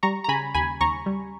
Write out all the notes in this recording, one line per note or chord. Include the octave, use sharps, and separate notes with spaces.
G3 A#5 C#6
A#5
C#3 G#5 B5
D#2 G#5 B5
D#2 A#5 C#6
G3